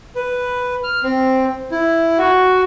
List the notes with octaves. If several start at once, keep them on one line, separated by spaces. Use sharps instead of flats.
B4
F6
C4
E4
F#4